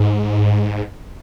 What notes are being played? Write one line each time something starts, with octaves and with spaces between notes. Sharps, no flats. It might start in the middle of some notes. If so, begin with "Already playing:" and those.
Already playing: G#2